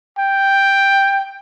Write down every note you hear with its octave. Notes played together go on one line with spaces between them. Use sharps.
G5